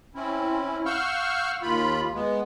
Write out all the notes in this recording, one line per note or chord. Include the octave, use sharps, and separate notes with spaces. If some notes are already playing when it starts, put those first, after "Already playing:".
C4 C#4 E4
F5 F#5 C#6 E6 F6 G6
D#2 F4 B5
G#3 B3